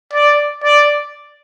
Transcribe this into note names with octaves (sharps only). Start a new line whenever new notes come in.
D5
D5